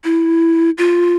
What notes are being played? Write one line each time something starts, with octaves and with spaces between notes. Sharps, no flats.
E4
F4